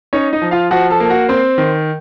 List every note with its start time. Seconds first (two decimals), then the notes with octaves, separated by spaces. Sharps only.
0.13 C#4 D#4 C#5
0.33 D#4 D#5
0.42 F3
0.51 F4 F5
0.71 F3 F#4 F#5
0.90 A4 A5
1.00 A#3
1.10 F#4 F#5
1.29 C4 C5 C6
1.58 D#3